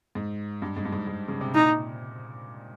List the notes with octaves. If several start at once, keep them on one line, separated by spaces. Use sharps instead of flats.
G#2
G2
G#2
G2
G#2
G#2
C#3
C3
A#2 D#4